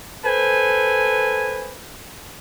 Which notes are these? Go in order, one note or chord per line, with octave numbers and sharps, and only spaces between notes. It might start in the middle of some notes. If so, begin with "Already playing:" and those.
A4 B4 C5 G#5